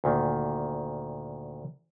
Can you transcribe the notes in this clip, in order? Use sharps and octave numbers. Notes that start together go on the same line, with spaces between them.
D2 A#2 D#3